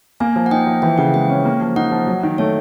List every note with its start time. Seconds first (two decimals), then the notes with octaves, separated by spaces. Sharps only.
0.20 A#3 G#5
0.36 F3
0.46 F#5
0.51 D#4 G5
0.67 F3
0.82 E3 G5
0.98 C#3 F#5
1.14 G#3 G5
1.30 C#4
1.45 A#3
1.61 F3
1.76 D#4 F#5
1.92 F3
2.07 F#3
2.23 D#3
2.38 A3 C#5